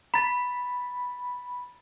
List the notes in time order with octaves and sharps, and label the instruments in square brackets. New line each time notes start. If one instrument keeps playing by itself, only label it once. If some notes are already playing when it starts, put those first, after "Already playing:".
[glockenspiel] A#5 A6 [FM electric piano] B5